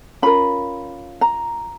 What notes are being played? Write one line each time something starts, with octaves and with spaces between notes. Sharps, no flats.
C#4 F4 A#4 B5
A#5